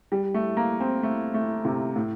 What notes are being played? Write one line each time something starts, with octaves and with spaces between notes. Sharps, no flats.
G3
A3
A#3
C4
A3
A3
C3
A2